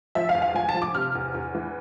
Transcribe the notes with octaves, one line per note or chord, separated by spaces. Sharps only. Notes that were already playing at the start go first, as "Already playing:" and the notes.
F3 E5
F5
E2
F5
F3 G#5
A5
F3
D6
C3 F6
E2
E2
E3